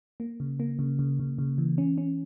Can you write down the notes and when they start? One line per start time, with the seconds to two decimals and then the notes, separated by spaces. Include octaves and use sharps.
0.20 A#3
0.40 C#3
0.60 A#3
0.79 C#3
0.99 C#3
1.19 C#3
1.38 C#3
1.58 E3
1.78 C#4
1.98 C#4